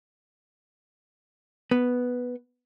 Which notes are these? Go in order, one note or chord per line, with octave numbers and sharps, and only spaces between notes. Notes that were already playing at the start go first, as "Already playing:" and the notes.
B3